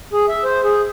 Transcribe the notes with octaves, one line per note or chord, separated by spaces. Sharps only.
G#4
E5
C5
G#4